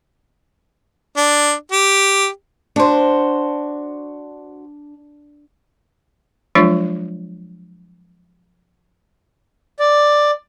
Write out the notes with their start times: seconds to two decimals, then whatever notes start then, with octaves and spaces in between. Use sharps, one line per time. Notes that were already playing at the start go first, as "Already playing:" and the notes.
1.17 D4
1.72 G4
2.76 D4 F#4 C5
6.55 F3 F#3 G#3 D4 F4
9.79 D5